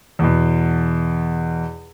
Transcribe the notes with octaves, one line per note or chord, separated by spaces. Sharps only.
E2 B2